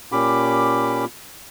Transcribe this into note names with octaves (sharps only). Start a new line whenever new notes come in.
A#2 C#4 G4 B5 D6